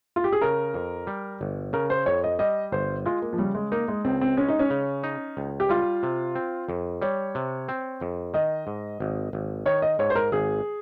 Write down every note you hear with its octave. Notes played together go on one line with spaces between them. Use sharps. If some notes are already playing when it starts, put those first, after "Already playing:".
F4
G4
G#4
C#3 A#4
F2
G3
G1
C#3 A#4
C5
F2 C#5
D#5
G3 D#5
G1 C5
G#3 F4
A#3
F3
C#3 G3
G#3
A#3 D#4
G#3
C#2 C4
C4
G#3 C#4
D#4
C#4
C#3
D#4
C#2
G4
G3 F4
C3
C4
F2
G3 C#5
C3
C4
F2
D#3 D#5
G#2
G#1
G#1
D#3 C#5
D#5
G#2 C#5
C5
A#4
G#1 G#4